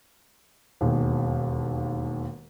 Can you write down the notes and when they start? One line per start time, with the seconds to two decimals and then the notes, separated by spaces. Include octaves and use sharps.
0.81 E1 D#2